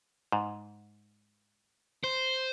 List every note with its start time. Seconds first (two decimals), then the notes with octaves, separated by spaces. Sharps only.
0.32 G#2
2.04 C5